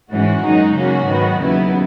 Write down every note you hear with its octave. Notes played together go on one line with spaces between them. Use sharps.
G#2 E3 G#3 C#4 F#4
F#2 D#3 G#3 D#4
C#3 F#3 A#3 C#4 F#4
G#2 D#3 F#3 B3
D#2 C#3 F#3 B3 E4